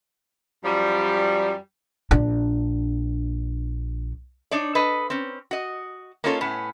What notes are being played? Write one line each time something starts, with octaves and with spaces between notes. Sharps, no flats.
F#2 F3 G3
A#1 D4
D4 D#4 C#5 D5
A4 B4 D#5
C4 C#4
F#4 D#5
A#3 C#4 D#4 F4 A4 C#5
A2 B3 C#4